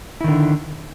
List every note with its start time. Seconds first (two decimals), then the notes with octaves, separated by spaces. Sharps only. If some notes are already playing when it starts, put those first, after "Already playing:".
0.21 E4
0.24 D#3
0.28 D3